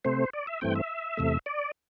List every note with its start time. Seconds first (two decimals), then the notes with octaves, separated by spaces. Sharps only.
0.04 C3 A3 C4 C5
0.33 D5
0.47 E5
0.61 G2 E3 A3 C4 G5
0.76 E5
1.17 E2 C3 A3
1.46 D5